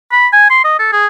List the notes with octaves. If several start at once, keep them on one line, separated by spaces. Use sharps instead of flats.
B5
G#5
C6
D#5
A4
G#4